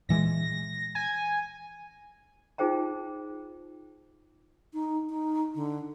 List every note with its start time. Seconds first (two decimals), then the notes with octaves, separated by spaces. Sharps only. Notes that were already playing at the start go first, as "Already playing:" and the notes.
0.09 A#2 E3 G#3 A#6
0.95 G#5
2.58 D#4 F4 G#4 C5 G5 A#5
4.73 D#4
5.09 D#4
5.55 D3